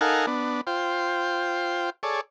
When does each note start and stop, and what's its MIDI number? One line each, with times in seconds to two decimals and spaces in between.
0.01 0.26 63
0.01 0.26 69
0.01 0.26 70
0.01 0.26 77
0.01 0.26 78
0.01 0.26 80
0.27 0.61 59
0.27 0.61 62
0.67 1.90 65
0.67 1.90 72
0.67 1.90 79
2.03 2.21 68
2.03 2.21 69
2.03 2.21 73
2.03 2.21 74